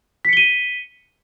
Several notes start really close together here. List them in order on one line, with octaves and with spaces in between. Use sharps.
B6 C#7 G7 D#7